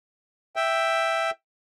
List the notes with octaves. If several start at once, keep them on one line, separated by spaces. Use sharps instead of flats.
E5 G5